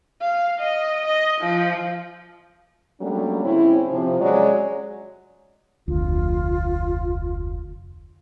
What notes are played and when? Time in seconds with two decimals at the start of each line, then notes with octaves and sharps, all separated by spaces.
0.22 F5
0.60 D#5
1.05 D#5
1.41 F3
3.01 F#3 G3 A3 A#3 C#4 D4
3.45 G#2 D3 C4 C#4 E4
3.89 C3 F3
4.21 F#3 G#3 C#4 C#5 D5
5.88 F1 D2 F4